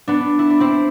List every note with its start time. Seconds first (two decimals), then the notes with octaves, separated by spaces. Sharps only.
0.07 B3 D4
0.39 E4
0.50 D4
0.60 C4 E4